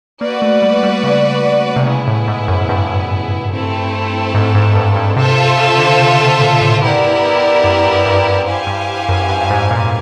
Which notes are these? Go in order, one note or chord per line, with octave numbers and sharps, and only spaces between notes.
A#3 F#4 B4 D5
A3
G3
G3
C#3
C3
C#3 B3 E4 G#4
A2
G#2
F#2
G2
A3 C4 E4 A4
G#2
G#2
G2
G2
C3 F4 A4 C5 E5
C#3
D3
C3
B2
A#2
A2
G2 B3 E4 G4 A#4 D5
F#2
G2
G2
G2
E4 G4 C5 F5 G#5
G2
F#2
G2
G2
G#2
A#2